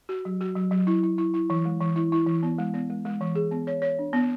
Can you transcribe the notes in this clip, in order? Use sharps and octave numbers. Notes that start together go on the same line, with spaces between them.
F#4
F#3
F#4
F#3
F#3
E4
E4
E4
E4
E3
G#3
E3
E4
E4
E3
B3
G#3
B3
G#3
G#3
E3
G#4
B3
C#5
C#5
D4
B3